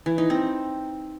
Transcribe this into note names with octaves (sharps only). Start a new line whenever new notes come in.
E3
D#4
C4